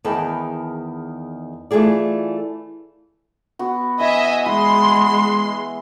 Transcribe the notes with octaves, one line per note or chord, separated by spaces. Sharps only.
E2 D#3 G#4 B4 G5 A5
E3 A3 F4 G#4 D5
B3 F#4
E3 D#5 E5 G#5
E3 G#3 B4 C6